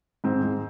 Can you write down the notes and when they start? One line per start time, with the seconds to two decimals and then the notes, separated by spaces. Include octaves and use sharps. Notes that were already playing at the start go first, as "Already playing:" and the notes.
0.24 G#2 C4
0.44 G#2